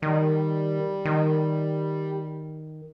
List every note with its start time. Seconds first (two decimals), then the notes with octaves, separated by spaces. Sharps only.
0.02 D#3 G3
1.05 D#3